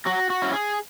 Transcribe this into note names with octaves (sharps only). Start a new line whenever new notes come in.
F#3 F#4
F#4
C#4 E4
G#4